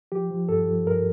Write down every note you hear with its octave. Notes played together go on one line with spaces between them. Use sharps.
F3 G4
F3
G2 A4
F3
G2 A#4